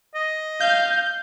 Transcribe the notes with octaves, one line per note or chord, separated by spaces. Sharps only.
D#5
F5 G6